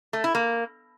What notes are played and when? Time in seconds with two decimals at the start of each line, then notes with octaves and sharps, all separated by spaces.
0.13 A3
0.24 E4
0.35 A#3